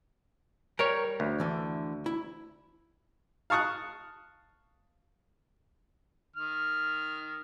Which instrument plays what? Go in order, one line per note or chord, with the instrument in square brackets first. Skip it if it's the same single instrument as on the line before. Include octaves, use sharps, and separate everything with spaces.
[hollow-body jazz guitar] G3 C5 G5 [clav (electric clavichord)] A#4 C#5
[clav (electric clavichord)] D2
[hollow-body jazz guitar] D3 E3
E4
[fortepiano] F5 A5 C#6 D#6 F#6
[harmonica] D#3 F6